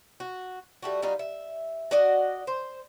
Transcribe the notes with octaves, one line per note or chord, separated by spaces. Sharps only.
F#4
G3 A3 F#4
G3 D#4 F4 F#4
E5
F#4 D5 D#5 F#5
C5